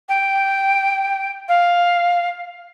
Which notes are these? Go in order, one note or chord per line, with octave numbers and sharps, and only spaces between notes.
G5
F5